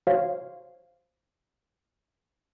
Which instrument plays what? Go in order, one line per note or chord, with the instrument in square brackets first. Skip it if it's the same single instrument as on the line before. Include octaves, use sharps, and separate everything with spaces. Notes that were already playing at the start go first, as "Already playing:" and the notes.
[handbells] F#4 C5 C#5 F5